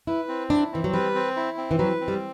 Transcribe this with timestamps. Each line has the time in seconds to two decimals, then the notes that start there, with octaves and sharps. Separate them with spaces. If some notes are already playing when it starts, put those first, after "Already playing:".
0.07 E4 B4
0.29 C4
0.50 D4 E4
0.72 E3 C4
0.84 F#3
0.93 G3 B4
1.15 C4
1.36 E4
1.57 C4
1.71 E3
1.79 F#3 B4
2.01 C4
2.08 G3